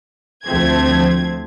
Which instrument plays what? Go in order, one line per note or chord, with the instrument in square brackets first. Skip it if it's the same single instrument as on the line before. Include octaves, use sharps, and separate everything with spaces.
[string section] D2 F3 A3 C4 G#6